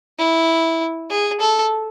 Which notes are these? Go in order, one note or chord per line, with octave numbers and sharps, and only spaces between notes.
E4
G#4
A4